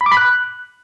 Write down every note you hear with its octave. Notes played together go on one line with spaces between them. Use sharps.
B5
D6
B5
F#6